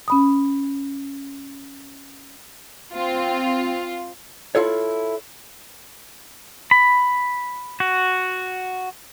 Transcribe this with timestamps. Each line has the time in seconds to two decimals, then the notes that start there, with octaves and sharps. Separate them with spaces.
0.08 C#4 B5 D#6
2.93 C4 F4
4.55 E4 F4 A4 C#5
6.71 B5
7.80 F#4